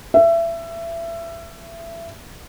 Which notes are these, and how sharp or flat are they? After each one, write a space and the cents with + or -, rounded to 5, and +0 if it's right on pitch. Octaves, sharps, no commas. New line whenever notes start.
E5 +25